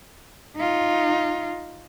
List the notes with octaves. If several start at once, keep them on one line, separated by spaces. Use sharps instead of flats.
D#4 F4